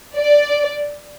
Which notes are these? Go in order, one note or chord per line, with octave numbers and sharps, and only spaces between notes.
D5